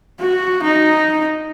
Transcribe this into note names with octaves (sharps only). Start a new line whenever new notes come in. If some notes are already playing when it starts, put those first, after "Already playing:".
F#4
D#4